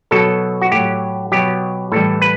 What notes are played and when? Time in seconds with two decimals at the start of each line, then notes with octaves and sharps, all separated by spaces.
0.11 B2 F#3 A4
0.62 F#4
0.71 A2 F#3 G4
1.32 B2 F#3 G4
1.92 A2 E3 G3 A4
2.22 B4